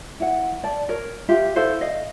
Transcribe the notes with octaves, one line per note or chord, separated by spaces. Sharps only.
E4 F#5
D5 A5
A#4 C#5
F4 G4 E5
E4 A4 C5 F5
D#5 F5